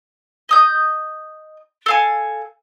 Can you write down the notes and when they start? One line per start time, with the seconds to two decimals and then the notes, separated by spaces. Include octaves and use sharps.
0.49 D#5 D#6 G6
1.86 A4 F5 G#5